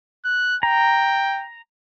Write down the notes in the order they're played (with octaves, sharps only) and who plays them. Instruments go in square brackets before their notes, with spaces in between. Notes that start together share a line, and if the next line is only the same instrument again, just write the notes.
[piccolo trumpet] F#6
[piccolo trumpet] G5 [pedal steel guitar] A#5